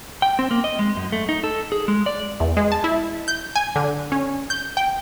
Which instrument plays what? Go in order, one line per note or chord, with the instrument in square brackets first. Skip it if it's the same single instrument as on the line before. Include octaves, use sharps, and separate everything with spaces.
[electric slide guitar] G5
C4
A#3
D#5
G#3
F#2
A3
D#4
A4
G#4
G#3
D5
[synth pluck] E2
G#3
A5
E4
G6
G#5
D3
C#4
G6
G5